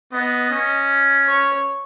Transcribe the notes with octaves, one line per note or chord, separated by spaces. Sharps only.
B3 D#5
C#4
C#5